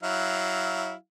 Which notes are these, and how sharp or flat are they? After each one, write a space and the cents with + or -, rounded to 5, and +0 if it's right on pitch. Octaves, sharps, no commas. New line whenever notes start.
F#3 +10 E4 -10 F5 +0